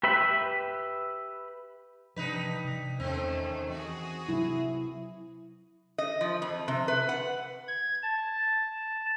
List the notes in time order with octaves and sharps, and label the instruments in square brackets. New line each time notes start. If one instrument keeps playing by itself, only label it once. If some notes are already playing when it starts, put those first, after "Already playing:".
[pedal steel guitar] G4 B4 E5 B5
[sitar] G2 D#4 B4 [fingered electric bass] C3 E3 F3
[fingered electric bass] C3
[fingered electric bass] E2 [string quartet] D#3 A3 C#4 [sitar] C4
[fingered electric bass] E3 [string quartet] F#4 G#4
[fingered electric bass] C3 F#3 [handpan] E4
[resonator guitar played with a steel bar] D#5
F3
F2
C3
B4
F#5
[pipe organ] G#6
A5